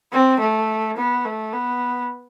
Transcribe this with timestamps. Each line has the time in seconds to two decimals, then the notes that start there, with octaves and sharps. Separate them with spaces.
0.13 C4
0.40 A3
0.97 B3
1.25 A3
1.53 B3